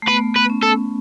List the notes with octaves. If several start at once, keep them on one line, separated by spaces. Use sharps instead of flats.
A3
B3 B4
B4
C#4
A4